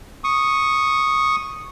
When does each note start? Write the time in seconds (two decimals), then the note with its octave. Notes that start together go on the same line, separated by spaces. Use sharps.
0.24 C#6 D#6